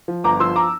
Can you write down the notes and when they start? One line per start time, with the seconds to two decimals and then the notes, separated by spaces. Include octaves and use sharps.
0.08 F3
0.24 G1 A#5 D6
0.40 F3 C6 E6
0.56 A#5 D6